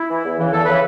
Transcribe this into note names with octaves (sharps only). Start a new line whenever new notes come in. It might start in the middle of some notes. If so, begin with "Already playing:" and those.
Already playing: E4
E3
E2
C#3 E3
E2 A4
C#3 E3 B4